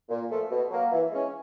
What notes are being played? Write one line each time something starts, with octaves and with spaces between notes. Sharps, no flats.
A#2
F3 A3
B2
F#3 A#3
E3
G#3 C#4